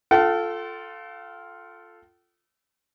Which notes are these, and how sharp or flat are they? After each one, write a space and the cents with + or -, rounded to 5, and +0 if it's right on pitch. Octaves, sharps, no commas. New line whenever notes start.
F4 +0 A4 +0 G5 -45